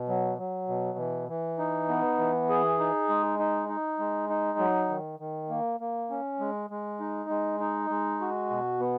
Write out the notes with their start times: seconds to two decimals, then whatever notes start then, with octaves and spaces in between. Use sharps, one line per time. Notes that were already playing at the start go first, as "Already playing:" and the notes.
Already playing: B2
0.09 F#3
0.38 F#3
0.68 B2
0.99 E3
1.29 E3
1.59 D#4
1.89 B3
2.18 E3
2.49 G#4
2.79 D#4
3.09 G#3
3.39 D#4
3.69 D#4
3.99 G#3
4.29 D#4
4.59 F#3
4.89 D#3
5.20 D#3
5.50 A#3
5.80 A#3
6.10 C#4
6.40 G#3
6.70 G#3
7.00 D#4
7.30 G#3
7.60 D#4
7.90 G#3
8.21 F#4
8.50 B2
8.80 B3